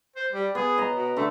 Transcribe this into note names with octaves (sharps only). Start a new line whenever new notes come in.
C5
G3
B3 G#4
D#5 A#5
B2
D3 A3